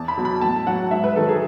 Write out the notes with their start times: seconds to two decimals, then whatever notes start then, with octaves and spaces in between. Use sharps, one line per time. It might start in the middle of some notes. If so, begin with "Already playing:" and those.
Already playing: E2 A5
0.08 B5
0.17 B2 F#3
0.25 B5
0.41 A2 A5
0.67 F#3 F#5
0.91 G#2 E5
1.04 B4
1.16 D#3 F#3 A4
1.29 G#4